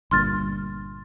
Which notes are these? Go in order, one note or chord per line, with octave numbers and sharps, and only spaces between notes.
G1 G2 A#2 C6 F6 A6